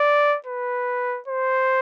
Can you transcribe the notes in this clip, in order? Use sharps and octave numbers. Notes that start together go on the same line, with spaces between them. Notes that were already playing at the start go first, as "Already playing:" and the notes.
Already playing: D5
B4
C5